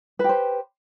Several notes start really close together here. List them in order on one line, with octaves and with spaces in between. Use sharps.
B4 G4 C5